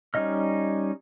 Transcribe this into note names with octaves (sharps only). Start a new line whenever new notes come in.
G3 C#4 D#4 D#5 F6